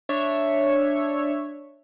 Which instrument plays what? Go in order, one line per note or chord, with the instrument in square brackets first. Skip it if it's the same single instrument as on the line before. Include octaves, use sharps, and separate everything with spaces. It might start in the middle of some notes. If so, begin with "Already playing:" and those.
[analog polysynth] D4 C#5 E5